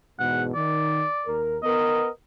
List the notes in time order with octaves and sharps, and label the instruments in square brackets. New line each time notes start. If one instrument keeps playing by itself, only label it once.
[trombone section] E2 G#2 B2 [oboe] F#5
[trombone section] D#3 [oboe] D5
[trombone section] D#2 A#4
[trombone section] B3 A#4 [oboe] D#5